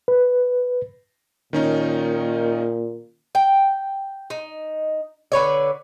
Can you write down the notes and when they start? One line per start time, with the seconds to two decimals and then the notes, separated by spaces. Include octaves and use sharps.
0.08 B4
1.53 A#2 D#3 C#4 D#4
3.35 G5
4.30 D#4
5.32 D3 B4 C#5 D5